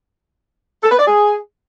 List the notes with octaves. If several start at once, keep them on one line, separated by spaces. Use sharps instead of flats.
A4
B4
D5
G#4